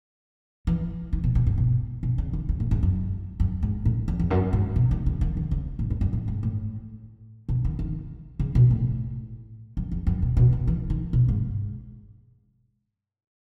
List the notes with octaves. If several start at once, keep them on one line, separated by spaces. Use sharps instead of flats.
E3
D#3
B2
B2
G#2
B2
B2
C#3
D#3
C#3
A2
G#2
F#2
F#2
G#2
A2
E2
E2
F#2
G#2
B2
D#3
C#3
D#3
D#3
C#3
A2
G#2
F#2
A2
G#2
A2
B2
D#3
D#3
C#3
B2
A2
F#2
E2
F#2
B2
B2
C#3
E3
D#3
B2
G#2